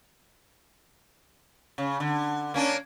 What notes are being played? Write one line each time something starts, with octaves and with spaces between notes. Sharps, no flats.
C#3
D3
A#3 C#4 D4